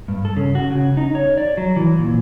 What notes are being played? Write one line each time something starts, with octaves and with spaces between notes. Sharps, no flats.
G2
A4
C#3
F#4
C#3
D#4
C#5
D5
F#3
E3
A#2